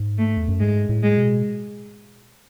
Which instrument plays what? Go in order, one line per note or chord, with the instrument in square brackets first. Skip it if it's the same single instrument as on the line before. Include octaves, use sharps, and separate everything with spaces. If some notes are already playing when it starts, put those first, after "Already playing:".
Already playing: [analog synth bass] G#2
[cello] A3
[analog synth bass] E2
F#2
[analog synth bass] G#2 [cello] G#3
[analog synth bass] A2
[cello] G#3
[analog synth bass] B2